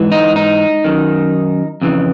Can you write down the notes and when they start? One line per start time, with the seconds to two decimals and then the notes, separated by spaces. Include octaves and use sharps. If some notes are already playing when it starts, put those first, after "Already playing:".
Already playing: G#2 E3
0.12 D#4
0.36 D#4
0.84 F#2 D#3
1.82 F2 C#3 E3